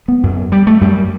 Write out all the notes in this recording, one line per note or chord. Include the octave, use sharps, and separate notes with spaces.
B3
F#2
G3
A3
F#2 G3